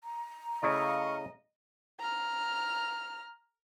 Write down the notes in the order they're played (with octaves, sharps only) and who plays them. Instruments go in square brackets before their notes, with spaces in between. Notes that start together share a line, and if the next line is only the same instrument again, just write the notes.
[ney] A#5
[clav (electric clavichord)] C#3 A3 E4 [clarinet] D#5 [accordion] F5 C#6 D#6
[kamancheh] A#5 F6